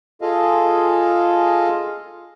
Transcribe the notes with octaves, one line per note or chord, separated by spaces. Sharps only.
F4 G#4 A4 D#5 F5